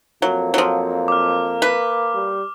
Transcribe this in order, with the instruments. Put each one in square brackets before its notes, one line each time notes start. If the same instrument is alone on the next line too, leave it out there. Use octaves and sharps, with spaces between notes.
[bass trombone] F2 [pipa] F#3 [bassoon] A#3
[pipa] F3 F#3
[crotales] D6 F6
[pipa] B4
[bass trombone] G3